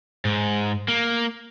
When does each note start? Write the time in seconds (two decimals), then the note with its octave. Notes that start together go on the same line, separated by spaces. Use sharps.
0.25 G#2
0.88 A#3